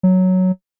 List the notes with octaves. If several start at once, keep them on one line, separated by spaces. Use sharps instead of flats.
F#3